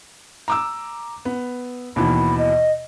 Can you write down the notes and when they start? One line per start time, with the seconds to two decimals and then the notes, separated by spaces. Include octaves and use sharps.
0.48 A#5 D6 E6
1.25 B3
1.96 D#2 B2 E3 B5
2.38 D#5